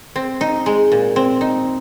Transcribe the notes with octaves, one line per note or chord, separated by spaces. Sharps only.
C4
D#4
G#3
A#2
C4
D#4